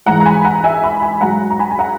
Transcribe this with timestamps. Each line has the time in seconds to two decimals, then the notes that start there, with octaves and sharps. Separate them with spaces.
0.06 G#2 E3 G#3 F#5 A#5
0.20 A#5
0.25 G#5 B5
0.45 F#5 A#5
0.64 E5 G#5
0.84 G#5 B5
1.02 G#5 B5
1.21 G#2 F#3 F#5 A#5
1.50 A#5
1.59 G#5 B5
1.71 G#5
1.79 F#5 A#5